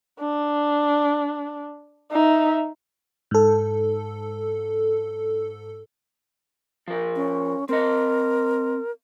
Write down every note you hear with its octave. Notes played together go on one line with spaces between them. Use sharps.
D4
D#4 E5
G#2 A4
F3 A#4
C#4
C4 A#4 D#5